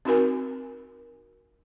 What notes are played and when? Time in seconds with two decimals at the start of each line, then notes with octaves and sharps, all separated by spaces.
0.05 C4 D#4 F#4 A#4 G#5